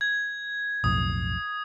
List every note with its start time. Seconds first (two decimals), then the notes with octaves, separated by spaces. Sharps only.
0.01 G#6
0.84 B1 F2 A2 D#6